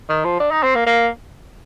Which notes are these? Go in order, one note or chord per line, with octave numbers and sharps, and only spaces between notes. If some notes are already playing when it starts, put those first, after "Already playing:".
D#3
F3
D4
D#4
C4
A#3
A#3